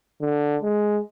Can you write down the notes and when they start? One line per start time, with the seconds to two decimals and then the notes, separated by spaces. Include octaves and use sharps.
0.21 D3
0.62 G#3